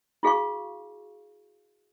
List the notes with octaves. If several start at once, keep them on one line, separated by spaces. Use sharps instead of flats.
E4 F#4 G#4 F5 A5 C#6